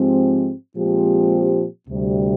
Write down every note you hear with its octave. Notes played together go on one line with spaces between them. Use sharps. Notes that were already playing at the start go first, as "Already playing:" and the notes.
Already playing: G#2 F3 G#3 C4 G4
A#2 F3 G#3 C4 G4
D2 C3 G3